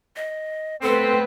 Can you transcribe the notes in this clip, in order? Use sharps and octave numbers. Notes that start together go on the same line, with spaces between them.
D#5
A3 B3 C4 A4 B4